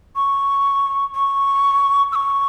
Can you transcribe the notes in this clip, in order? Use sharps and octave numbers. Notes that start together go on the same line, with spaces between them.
C#6
C#6
E6
C#6